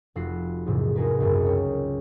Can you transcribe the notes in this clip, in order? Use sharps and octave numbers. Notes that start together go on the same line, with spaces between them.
F1 F4 F#4 F#5 B5 C7
A#1 E2 G#2 C3
D#4 F#4 G#4 A#4 B4
G#1 C#2 F#2
C#5 G5